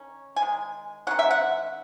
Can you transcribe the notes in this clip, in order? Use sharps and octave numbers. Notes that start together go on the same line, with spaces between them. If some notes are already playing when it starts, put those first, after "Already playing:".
Already playing: D#3 C#4
G#5
D#3 G#3
D#3 G#3 C#4 F#5
E5
F#5